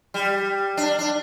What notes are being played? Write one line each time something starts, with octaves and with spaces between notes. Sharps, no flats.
G3
D4
D4